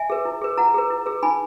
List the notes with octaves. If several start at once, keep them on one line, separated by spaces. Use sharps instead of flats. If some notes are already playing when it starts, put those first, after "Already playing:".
Already playing: E5 G#5
G#4 B4
E4
G#4 B4
E4 F#5 A#5
G#4 B4
E4
G#4 B4
D#4 G#5 B5